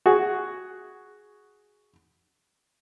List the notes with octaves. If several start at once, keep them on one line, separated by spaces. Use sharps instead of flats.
F#4 G#4